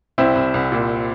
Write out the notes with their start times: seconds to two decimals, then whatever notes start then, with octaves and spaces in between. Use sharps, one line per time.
0.18 C2 C4 E4
0.35 C2
0.54 C2
0.72 A#2